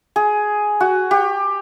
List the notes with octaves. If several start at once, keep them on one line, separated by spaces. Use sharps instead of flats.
G#4
F#4
G4